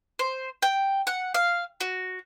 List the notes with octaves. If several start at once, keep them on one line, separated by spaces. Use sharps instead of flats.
C5
G5
F#5
F5
F#4